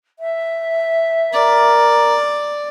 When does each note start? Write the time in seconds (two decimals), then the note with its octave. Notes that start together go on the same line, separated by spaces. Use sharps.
0.19 E5
1.33 A#4 D5